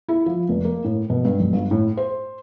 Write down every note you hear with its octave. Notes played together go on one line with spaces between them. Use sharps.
E4
F3
F1
A#3
A2
B2
G2
B1
G1
A2
C5